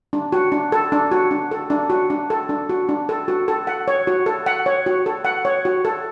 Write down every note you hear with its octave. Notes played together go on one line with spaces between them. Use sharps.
D4
F#4
D4
A4
D4
F#4
D4
A4
D4
F#4
D4
A4
D4
F#4
D4
A4
F#4
A4
F#5
C#5
F#4
A4
F#5
C#5
F#4
A4
F#5
C#5
F#4
A4